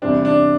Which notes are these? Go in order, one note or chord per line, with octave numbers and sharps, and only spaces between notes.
E2 C3 G3 C4 D4
D4